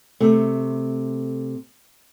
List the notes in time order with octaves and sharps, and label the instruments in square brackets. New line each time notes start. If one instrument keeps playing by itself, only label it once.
[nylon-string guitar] C3 A3